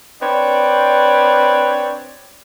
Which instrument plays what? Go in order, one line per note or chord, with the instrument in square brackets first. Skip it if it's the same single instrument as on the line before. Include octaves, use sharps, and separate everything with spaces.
[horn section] C4 D4 B4 C#5 D5